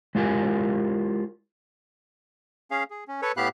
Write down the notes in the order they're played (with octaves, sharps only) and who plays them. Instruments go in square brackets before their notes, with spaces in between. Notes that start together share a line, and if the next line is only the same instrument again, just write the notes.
[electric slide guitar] G#3 E4 F4 G4 A#4 G#5
[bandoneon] C#4 G#4 F5
G#4
C#4
A4 B4 C#5
A2 B3 G4 F5 B5 F#6